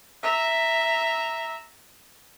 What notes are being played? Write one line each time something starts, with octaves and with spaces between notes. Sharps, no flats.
E5 A#5